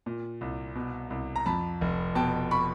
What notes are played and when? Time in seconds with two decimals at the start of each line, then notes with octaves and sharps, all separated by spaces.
0.06 A#2
0.41 C2
0.75 B2
1.10 C2
1.36 A#5
1.46 F2 A5 B5
1.81 F1
2.15 B2 G5 A5
2.51 B5 C#6